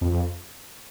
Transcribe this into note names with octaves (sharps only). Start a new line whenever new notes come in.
F2